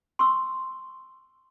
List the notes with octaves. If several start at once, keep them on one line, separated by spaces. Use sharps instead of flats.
C6 C#6 E6